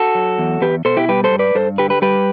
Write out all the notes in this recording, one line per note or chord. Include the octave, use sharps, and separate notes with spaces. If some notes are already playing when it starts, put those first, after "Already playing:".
Already playing: F#4 A4
F#3
E2
E2 G4 B4
B2 A4 C5
E4 G4
G3 G4 B4
A4 C5
G2
B4 D5
G2 A4 C5
D3 G4 B4
G4 B4
G3 G4 B4